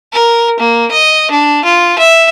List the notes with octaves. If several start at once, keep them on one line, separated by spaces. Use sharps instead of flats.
A#4
A#3
D#5
D4
F4
E5